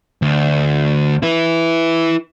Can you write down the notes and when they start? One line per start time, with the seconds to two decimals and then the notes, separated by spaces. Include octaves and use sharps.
0.22 D2
1.23 E4 B4